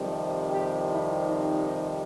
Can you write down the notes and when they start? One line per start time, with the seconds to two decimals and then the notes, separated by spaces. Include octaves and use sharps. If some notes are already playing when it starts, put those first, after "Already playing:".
Already playing: F2 C3 D#3 G3
0.49 G4
0.87 E4
1.25 D#4